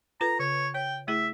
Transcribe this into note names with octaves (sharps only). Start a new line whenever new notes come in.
F4 A4 B4 A#5
C#3 C#5
C#5 G5
A3 E4 G#4 E5